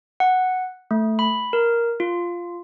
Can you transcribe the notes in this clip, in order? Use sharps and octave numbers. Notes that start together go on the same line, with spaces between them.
F#5
A3
B5
A#4
F4